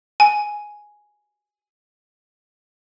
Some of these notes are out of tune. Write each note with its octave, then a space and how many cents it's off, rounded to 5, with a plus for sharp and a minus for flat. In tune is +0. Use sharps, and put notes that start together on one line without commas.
G#5 +5